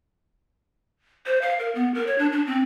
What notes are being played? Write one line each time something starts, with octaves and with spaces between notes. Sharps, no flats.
C5
F5
A#4
B3
A#4
C#5
D4
D4
C4